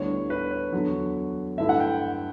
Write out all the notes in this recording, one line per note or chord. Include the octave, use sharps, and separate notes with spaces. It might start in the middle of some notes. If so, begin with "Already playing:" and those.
Already playing: D2 D3 G3 B3 E4 C#5
B4
C#5
E2 D3 F#3
G2 D3 A3 E4 E5
F#5
G5